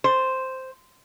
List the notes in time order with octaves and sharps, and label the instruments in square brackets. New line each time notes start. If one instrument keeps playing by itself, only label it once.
[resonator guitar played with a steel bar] C5